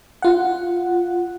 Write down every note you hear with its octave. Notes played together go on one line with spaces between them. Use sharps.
F4 F#5